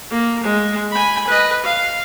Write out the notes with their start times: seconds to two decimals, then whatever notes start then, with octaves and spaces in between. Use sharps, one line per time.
0.10 A#3
0.44 G#3
0.91 G#5 B5
1.27 B4 D#5
1.64 F5